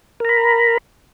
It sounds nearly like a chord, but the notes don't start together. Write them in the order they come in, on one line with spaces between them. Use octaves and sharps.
A#4 A#5 B5